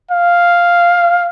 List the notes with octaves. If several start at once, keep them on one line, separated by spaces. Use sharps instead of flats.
F5